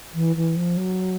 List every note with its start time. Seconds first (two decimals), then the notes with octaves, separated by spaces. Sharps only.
0.14 E3
0.36 E3
0.56 F3
0.77 F#3